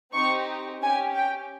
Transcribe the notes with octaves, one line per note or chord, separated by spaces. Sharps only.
C4 D#4 G4 C#6
C#4 G4 G#5
G5